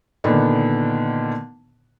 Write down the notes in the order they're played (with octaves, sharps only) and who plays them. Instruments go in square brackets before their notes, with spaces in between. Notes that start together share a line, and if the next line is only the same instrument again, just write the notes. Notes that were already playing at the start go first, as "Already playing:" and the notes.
[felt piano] A#2 D3 D#3 B3 D4